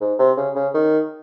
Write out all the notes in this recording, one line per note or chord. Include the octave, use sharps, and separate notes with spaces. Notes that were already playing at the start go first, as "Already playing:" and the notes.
G#2
C3
C#3
C#3
D#3